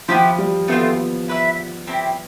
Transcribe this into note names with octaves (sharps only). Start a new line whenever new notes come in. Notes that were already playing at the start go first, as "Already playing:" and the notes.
F3 B3 E4 G4 C5
G3
A3 B3 C4 F4
E4 B4 E5
C4 E4 G4